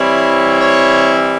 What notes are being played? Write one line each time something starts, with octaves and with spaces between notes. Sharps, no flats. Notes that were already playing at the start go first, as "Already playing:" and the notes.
Already playing: E3 G3 C4 E4 C#5
C#5